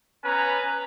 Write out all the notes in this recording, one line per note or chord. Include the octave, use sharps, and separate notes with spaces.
B3 C#4 B4 G#5 A#5